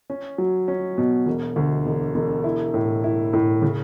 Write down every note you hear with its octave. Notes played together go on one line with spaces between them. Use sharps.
C#4
F#3
C#4
B2
E1
D2
E1
E1
E4
A2
E4
A2
C#3